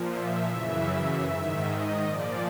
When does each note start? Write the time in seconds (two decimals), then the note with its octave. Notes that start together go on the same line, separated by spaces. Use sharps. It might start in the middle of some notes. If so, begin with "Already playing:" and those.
Already playing: A#2 F3
0.08 E5
0.47 F#2 C#3 E3 E5
1.25 G#2 D#3
1.64 D#5
2.03 A#2 F3 D5